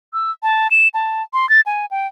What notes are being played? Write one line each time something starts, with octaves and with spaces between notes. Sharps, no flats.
E6
A5
E7
A5
C6
A6
G#5
G5